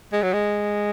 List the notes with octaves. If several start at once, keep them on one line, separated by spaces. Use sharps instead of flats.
G#3
F#3
G#3